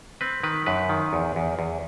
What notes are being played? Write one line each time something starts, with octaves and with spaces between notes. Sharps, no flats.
C4 B4
D#3 B4
F#2 B4
D#3
E2
E2
E2